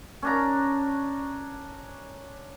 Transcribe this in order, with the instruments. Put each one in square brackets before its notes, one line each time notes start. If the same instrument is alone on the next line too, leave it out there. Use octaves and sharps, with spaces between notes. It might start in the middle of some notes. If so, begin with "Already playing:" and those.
[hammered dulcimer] C#4 D4 A#5